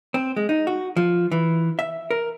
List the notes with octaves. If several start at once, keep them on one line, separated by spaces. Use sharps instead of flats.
C4
G#3
D#4
F#4
F3
E3
E5
A#4